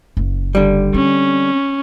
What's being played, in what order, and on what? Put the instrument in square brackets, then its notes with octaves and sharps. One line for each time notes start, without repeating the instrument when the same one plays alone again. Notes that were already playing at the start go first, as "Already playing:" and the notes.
[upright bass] F#1
[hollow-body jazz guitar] D3 G3
[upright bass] C4 [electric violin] C#4